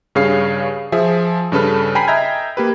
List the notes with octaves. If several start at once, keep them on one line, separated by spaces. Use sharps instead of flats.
G2 C#3 G#4 C#5 F5 C7
F3 G#4 E5
G2 C#3 A4 B4 F6
G5 G#5 A#5 B5 B6 C7
D#5 E5 G5 A#5 G6 G#6
A#3 G4 B4